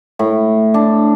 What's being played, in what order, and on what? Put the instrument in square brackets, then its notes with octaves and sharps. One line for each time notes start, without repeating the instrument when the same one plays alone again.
[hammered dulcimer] A2
D4